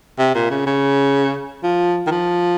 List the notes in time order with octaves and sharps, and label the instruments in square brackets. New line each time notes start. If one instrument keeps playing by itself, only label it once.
[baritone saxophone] C3
A#2
C#3
C#3
F3
D#3
F3